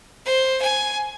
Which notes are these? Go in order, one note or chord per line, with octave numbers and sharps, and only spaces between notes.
C5
G#5